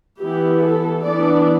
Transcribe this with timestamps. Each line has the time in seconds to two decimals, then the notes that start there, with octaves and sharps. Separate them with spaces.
0.19 E3 B3 E4 G4
0.62 A4
1.04 E3 B3 D4 D5